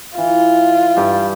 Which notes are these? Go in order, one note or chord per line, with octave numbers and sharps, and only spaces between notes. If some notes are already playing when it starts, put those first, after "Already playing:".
E3 F4
G2 G4